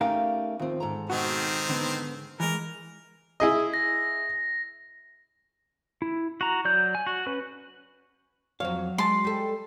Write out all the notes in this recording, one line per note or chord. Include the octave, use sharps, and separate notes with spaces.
A3 C#4 D#4 G4 A#4 F5
D#2 F3 C4
G#2 A4 A#5
B2 D#3 C4 F#4
D3 B3
E3 G#3 A#4
E4 G#4 D#5
A#6
E4
F#4 A#5
F#3 D5 G6
G#5
F#4
C#4 B4
F2 F#3 C#5 F5
G#3 A5 C6
G3 A4